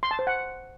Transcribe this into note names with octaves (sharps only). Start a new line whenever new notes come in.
C6
A5
C5
F#5